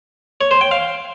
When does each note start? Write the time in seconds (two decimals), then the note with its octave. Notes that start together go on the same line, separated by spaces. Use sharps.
0.41 C#5
0.51 C5
0.61 G5
0.71 F5